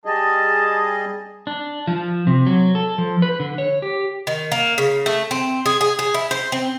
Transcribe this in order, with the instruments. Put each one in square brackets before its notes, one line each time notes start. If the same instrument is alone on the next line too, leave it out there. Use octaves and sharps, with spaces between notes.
[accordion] G3 G#4 D#5 [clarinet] A5
[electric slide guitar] D4
F3
C3
F#3
A4
F3
B4
D3
C#5
G4
[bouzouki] D#3
A#3
C#3
A3
C4
G#4
G#4
G#4
E4
C5
C4